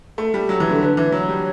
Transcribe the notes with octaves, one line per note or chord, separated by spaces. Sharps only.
A3 A4
G3
F#3
E3
D3
D3 B4
E3 B4
F#3 C#5
G3